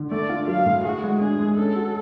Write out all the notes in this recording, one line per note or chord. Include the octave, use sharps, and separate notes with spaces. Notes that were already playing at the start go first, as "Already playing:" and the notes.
Already playing: D3
A3 D5
F4
F#3 F5
A2
F#4 G#4
G#3
D4 G#4
G#3
C#4 A4
F#4